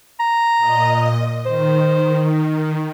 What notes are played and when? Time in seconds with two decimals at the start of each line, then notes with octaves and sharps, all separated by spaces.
0.20 A#5
0.58 A#2 D#5
1.46 D#3 C5